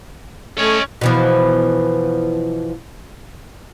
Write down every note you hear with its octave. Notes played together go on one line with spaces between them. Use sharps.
A3 C#4 C#5 D#5
B2 E3 F3